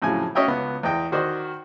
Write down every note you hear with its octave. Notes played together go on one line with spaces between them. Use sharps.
F2 A2 C#3 F#3 G#5
C#4 F#4 C#5 D#5 E5 G5
C#2 B3
E2 D#5 G5 D#6
D#3 F#4 C5 D5 D#5